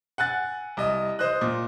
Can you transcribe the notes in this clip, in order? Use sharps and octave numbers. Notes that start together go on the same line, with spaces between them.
F#5 G#5 F#6 A6
C2 D#5
C5 D#5 D#6 F#6
A#2